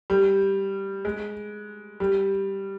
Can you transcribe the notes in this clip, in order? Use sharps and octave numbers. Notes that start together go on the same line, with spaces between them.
G3
G#3
G3